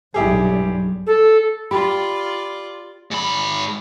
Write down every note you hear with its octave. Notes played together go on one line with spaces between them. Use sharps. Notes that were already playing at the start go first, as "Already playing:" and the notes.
B1 G2 E4 G4 G#4
A4
F4 G4 D5 B5
G#2 B5